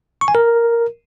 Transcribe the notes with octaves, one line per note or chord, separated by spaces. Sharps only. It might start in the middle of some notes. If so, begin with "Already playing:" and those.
C#6
G#5
A#4